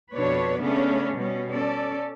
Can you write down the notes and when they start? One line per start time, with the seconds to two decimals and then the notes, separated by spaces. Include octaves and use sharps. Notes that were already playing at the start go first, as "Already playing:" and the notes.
0.14 F2 B2 D4 B4 C#5
0.61 C#3 A3 B3 C#4 D4
1.14 B2 G3 C#4
1.50 C#4 A4 D5